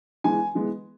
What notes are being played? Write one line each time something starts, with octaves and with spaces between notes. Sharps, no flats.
E3 G#3 B3 G#5
E3 G#3 B3